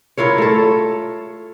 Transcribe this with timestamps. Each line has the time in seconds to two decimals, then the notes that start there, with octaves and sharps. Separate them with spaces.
0.18 E4 F4 A#4 C#5
0.38 A3 A4